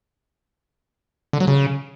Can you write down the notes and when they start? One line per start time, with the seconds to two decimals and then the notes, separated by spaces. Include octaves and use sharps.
1.33 D3
1.40 F#3
1.47 C#3